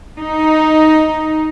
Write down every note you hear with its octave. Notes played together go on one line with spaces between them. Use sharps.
D#4